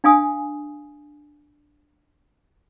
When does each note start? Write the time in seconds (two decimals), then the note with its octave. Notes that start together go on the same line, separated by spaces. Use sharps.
0.04 D4 F5 G#5 D#6